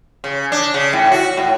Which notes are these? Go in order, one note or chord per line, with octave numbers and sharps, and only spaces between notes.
C#3
D4
C#3
A2
F#4
A2